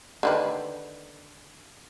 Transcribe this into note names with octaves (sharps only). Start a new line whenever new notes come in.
D3 D#3 B4